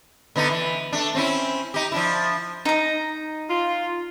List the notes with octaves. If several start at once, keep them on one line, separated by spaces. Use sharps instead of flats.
D3 B3 D#4
E3
A3 D4
C4 C#4 E4
D#4 G4
F3 D4 E4
D#4 A#5
F4